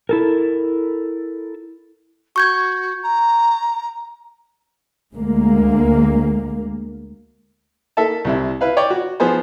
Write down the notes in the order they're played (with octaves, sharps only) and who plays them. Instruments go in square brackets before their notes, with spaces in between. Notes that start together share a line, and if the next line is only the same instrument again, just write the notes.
[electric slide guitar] E4 A4 A#4
[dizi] F#4 [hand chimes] C#6 G6 G#6
[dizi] A#5
[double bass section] D2 G#3 A#3
[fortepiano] A#3 A4 E5 A5
C2 C3 E4
E4 B4 F5
C#5 D5 G5
F#4
F3 B3 G#4 C5